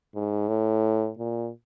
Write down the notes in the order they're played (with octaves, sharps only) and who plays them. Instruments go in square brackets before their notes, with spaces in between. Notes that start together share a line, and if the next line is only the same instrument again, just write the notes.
[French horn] G#2
A2
A#2